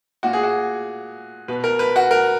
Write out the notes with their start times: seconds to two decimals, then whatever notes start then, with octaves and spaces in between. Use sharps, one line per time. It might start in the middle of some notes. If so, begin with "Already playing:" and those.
0.23 A#2 F#4
0.33 G#4
0.43 F#4
1.48 B2 B4
1.64 A#4
1.79 B4
1.96 F#4
2.11 A#4